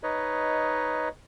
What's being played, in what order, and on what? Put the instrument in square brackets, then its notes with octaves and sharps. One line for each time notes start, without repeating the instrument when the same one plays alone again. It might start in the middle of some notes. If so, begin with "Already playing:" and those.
[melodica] D#4 B4 C#5 D#5